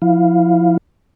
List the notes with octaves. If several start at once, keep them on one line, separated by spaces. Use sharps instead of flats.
F3 E4 F5